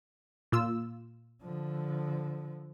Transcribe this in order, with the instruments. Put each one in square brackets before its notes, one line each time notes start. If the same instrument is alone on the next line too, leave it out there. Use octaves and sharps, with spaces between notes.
[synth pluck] A#2 F4 E6
[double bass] D3 F3